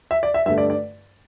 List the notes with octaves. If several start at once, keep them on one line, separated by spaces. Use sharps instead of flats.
E5
D5
E5
G2 D3 A3 E5
D5
D5